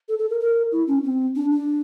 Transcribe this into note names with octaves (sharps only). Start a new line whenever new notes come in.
A4
A4
A#4
A#4
E4
C#4
C4
D4
D4